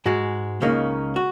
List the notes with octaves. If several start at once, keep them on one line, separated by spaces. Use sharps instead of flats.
G#2 G#3 F#4
C#2 C#3 A#3 D#4
F#4